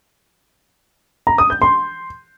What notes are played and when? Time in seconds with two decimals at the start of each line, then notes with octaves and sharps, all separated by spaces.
1.27 A#5
1.38 D#6
1.50 G6
1.62 C6